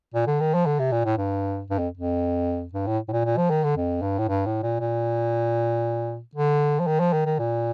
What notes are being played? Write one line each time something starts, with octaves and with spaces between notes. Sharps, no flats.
A#2
D3
D#3
F3
D3
C3
A#2
A2
G2
G2
F2
F2
G2
A2
A2
A#2
A#2
F3
D#3
D3
F2
G2
A2
G2
A2
A#2
A#2
D3
F3
D#3
F3
D#3
D#3
A#2